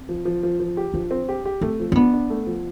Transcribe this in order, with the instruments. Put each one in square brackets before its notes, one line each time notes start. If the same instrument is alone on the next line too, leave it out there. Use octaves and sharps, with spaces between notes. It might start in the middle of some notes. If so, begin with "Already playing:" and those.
Already playing: [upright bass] C4
[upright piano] F3
F3
F3
F3
G4
[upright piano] F3 [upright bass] D4
[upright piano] C4
G4
G4
[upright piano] A3 [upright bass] C4
[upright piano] F3
[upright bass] C4
[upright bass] B3 [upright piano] D4
[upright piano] D4
A3
F3